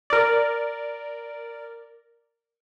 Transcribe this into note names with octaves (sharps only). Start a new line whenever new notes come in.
A#4 D5